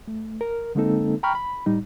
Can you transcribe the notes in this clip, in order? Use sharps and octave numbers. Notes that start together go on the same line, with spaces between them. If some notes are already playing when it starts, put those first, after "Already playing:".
A3
A#4
D3 G#3 A#3 C4 D#4 A4
G5 A#5 B5 C#6 F6
B5
A2 G3 D#4